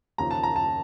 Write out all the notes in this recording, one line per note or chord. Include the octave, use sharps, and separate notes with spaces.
D#2 C#3 F3 A#5
A5
A#5
A5